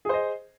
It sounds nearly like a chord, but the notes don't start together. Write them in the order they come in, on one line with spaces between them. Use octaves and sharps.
G#4 C5 D#5